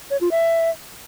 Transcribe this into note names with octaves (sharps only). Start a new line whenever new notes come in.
C#5
F4
E5